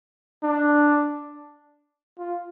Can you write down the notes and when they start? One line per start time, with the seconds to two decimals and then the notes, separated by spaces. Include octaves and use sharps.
0.43 D4
2.19 F4